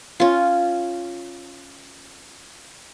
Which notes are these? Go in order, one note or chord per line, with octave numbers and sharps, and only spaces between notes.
C#4 F4